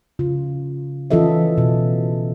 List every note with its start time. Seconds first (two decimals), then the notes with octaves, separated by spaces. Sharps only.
0.19 C#3 F4
1.11 E3 C#4 F4 A4 D#5 E5
1.58 B2